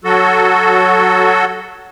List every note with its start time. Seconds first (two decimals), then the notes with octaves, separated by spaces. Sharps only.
0.04 F#3 F#4 A4